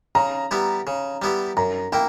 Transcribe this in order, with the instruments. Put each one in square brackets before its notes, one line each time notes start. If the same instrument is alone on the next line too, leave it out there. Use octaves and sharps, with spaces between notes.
[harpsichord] C#3 [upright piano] A#5
[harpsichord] G3 B3 E4 G4
C#3
G3 B3 E4 G4
[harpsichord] F#2 [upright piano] A#5
[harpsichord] A#3 E4 [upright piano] G5